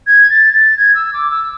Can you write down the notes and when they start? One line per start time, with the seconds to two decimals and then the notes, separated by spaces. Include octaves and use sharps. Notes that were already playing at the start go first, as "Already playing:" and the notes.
0.07 G#6
0.30 A6
0.54 A6
0.78 G#6
0.95 E6
1.13 D6
1.31 E6